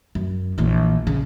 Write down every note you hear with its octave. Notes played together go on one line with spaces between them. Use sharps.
F#2
A#1 E3
C#3